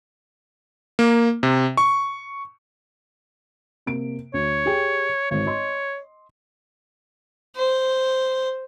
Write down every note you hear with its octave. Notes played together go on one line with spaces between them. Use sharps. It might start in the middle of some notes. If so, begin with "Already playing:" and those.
A#3
C3
C#6
C3 A#3 D7
D2 C#5
G4 G#4 G5
G#1 C#5
D#5 C6
C5